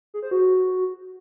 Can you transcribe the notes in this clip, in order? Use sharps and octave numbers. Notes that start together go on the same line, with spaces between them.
G#4
C5
F#4